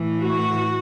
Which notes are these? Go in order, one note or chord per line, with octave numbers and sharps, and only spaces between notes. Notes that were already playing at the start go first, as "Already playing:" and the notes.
Already playing: A2 E3
F#4